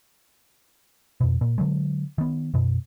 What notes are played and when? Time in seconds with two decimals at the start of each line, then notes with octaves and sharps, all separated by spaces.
1.21 F2 B2
1.41 A#2
1.58 D3 F#3 G#3
2.18 D#3 B3
2.54 F#2 B2